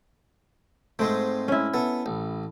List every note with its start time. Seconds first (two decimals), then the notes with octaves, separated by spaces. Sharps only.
0.99 G#2 G#3 A3 C4
1.48 C#4 E4
1.74 B3 A4
2.06 A1